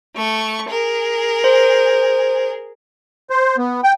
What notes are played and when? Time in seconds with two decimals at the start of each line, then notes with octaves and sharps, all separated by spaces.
0.15 A3 C#6
0.69 G#4 A#4
1.44 C5
3.30 C5
3.58 B3
3.84 G5